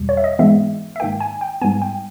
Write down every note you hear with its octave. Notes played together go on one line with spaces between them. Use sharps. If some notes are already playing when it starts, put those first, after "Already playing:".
Already playing: E2 B2 G3
C#5
E5
D#5
G#2 E3 G#3 B3 E5
E5
G#2 D#3 A#3 G5
G#5
G5
G#2 G3 B3 G#5
G5